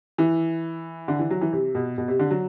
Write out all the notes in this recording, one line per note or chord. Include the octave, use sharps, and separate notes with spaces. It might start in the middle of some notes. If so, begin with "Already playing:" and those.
E3
D3
E3
F#3
E3
C3
B2
B2
C3
D3
F#3